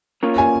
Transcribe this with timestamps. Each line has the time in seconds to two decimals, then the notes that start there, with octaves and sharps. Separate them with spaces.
0.23 A#3 C#4 F4 A#4 C#5
0.38 G#5